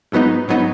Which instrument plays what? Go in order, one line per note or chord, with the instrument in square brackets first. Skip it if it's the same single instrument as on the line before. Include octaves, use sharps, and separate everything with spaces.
[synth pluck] G#2 F#3 B3 D#4
G#2 F#3 B3 D#4